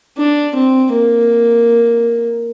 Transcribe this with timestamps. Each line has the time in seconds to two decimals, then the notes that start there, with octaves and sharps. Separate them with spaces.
0.18 D4
0.55 C4
0.92 A#3